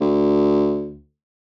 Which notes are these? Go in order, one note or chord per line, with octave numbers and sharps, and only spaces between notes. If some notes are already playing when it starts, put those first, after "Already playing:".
D2